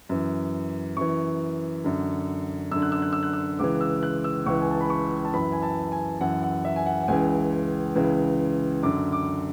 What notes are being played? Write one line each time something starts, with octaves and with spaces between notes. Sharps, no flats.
F#2 E3
F#2 E3 C#6
F#2 D3
F#2 D3 E6
F#6
E6
F#6
E6
F#6
E6
C#2 C#3 E3 D6
E6
F#6
E6
C#2 C#3 E3 C#6
G#5
A5
B5
C#6
A5
F#2 E3 B5
G#5
A5
G#5
F#2 E3 F#5
F#5
E5
G#5
F#5
F#5
C#2 C#3 E3 G#5
C#2 C#3 E3
F#2 D3 D6
D6